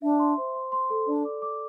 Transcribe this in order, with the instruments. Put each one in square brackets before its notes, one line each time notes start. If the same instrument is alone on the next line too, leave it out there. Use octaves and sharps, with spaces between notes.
[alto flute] D4 [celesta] E5
[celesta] C6
C5
C6
C6
A4
[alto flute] D4 [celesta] D5
[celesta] D6
D6